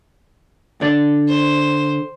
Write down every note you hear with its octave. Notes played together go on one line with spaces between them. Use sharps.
D3 D5
C5